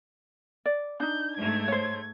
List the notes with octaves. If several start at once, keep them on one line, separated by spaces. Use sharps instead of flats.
D5
D4 D#4 G6
G#2 A3 G#6
C5 C#5